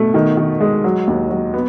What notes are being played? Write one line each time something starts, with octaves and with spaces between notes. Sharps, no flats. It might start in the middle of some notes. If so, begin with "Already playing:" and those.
Already playing: B2 A3
D#3
D#3
G#3
F#3
D#2
F#3
B3